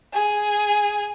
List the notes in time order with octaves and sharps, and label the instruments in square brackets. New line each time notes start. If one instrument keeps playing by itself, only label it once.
[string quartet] G#4